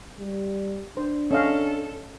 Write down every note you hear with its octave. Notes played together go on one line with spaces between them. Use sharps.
G3
D4 C5
C#4 A4 D#5 F5